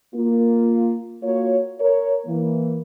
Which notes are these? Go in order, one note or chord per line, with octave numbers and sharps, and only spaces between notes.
A#3 F4
A#3 F4 F#4 C#5
A#4 C#5
E3 A#3